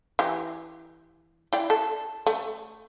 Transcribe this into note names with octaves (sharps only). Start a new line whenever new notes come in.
E3 G4
E4 D5 G5
A4
A3